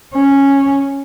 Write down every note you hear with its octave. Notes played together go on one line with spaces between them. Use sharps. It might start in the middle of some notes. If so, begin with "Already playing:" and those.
C#4